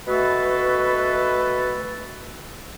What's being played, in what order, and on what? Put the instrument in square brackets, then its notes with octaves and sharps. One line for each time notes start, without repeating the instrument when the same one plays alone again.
[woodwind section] B2 A3 F#4 A4 B4